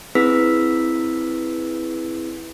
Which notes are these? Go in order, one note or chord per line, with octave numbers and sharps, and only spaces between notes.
C4 E4 G#4 B4 E6 B6